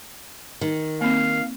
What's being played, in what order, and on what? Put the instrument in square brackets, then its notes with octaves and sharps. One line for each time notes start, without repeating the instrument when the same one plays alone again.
[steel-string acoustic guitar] D#3
[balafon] A#3 C4 [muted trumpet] F5